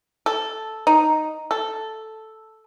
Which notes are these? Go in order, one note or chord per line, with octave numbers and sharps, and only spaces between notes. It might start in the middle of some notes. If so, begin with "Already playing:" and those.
A4
D#4
A4